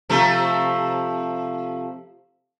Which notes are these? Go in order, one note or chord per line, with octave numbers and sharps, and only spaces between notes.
C3 F3 A3